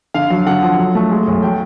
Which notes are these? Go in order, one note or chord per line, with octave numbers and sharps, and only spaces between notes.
D3 F5
F#3
D3 F#5
F3
F#3
A3
G#3
B1
F#3 G5